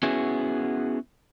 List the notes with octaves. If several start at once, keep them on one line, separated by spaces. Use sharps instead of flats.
B3 C#4 E4 F#4 G#4